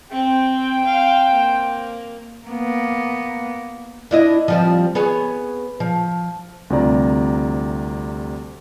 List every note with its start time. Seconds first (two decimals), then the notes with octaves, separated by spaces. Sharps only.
0.11 C4 C5 G5
0.86 F5
1.31 A#3
2.48 A#3 B3
4.11 D4 E4 D#5
4.48 F3 G3 C4
4.95 B3 G#4 C#5
5.80 F3
6.70 D2 C3 G3 F4 D5 A#5